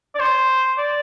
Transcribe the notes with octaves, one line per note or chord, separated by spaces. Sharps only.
D5
C5
D5